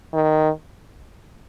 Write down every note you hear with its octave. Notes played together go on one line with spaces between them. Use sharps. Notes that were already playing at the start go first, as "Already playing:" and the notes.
D#3